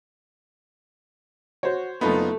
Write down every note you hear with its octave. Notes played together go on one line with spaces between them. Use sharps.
F#4 C5 C#5
F#1 A3 B3 D#4 F4 B5